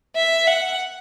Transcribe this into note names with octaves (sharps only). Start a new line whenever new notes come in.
E5
F#5